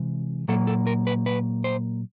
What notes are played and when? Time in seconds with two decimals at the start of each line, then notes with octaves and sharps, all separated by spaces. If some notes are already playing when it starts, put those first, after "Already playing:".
Already playing: C3 E3 G#3
0.48 A#2 F#3 A#3 A4
0.67 A4
0.87 A#4
1.07 B4
1.26 B4
1.64 C5